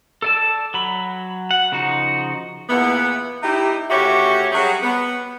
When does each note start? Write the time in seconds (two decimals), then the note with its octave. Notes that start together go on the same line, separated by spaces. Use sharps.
0.22 A4 D5 A5
0.74 F#3 B5
1.51 F#5
1.72 C#3 F3 D#4 F#4
2.69 E2 A#2 E3 B3
3.43 D#4 E4 G4
3.90 D2 C#3 F#4 G4 C#5 E5
4.52 F#3 G3 C#4 F#4 G#4
4.83 B3